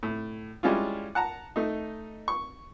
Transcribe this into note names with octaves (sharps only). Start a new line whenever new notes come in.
A2
G3 G#3 C#4 E4 F4
F#5 A5 A#5
A3 D#4
C#6